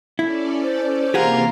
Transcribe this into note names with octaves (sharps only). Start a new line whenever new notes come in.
C#4 E4 A4 D5
C5
C3 E3 A#3 F4 G4 G#4 A#4 F#5